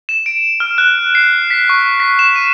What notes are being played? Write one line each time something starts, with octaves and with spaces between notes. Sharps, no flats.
E7
D7
F6
F#6
C7
B6
C#6
B6
E7
D#7